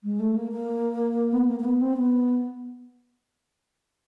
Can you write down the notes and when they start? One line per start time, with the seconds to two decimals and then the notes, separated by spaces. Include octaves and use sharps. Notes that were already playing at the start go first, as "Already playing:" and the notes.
0.04 G#3
0.20 A3
0.36 A#3
0.52 A#3
1.33 B3
1.49 A#3
1.60 A#3
1.65 B3
1.81 C4
1.97 B3